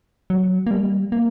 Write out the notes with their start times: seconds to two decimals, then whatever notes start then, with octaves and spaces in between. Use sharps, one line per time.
0.30 F#3
0.67 A#3
0.71 G3
1.12 A#3